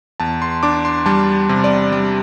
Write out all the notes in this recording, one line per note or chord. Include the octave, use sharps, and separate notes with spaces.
E2 A5
C6
D4 D6
C6
G3 A5
C3
D5
G3